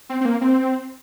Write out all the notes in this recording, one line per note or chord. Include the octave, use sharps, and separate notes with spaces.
C4
C4
A#3
C4